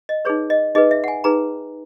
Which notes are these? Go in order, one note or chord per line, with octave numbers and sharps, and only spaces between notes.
D#5
D#4 G#4 B4 C#5
D#5
D#4 G#4 B4 D#5
E5
F#5
G#5
D#4 G#4 B4 A#5